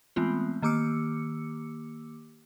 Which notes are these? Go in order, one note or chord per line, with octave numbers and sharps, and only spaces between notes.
E3 G#3 A3 B3 C4 F4
D#3 A#3 G4 D6 E6 C#7